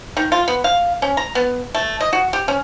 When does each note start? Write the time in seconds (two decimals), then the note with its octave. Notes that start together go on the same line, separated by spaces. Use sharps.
0.17 D#3
0.32 F4
0.48 B3
0.64 F5
1.02 C#4
1.17 A#5
1.35 B3
1.75 A3
2.01 D#5
2.13 F#4
2.33 G4
2.48 C#4